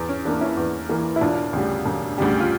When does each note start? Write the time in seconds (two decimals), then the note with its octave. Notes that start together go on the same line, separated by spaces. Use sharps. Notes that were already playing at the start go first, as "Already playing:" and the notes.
Already playing: E2
0.09 C#4
0.25 E3 D4
0.28 A#3
0.41 C#4 E4
0.57 E2
0.89 E3 A#3
1.16 E4
1.21 E1 D4 F4
1.53 D2 C#3 G3
1.86 E1
2.18 D2 C#3 G3
2.40 F4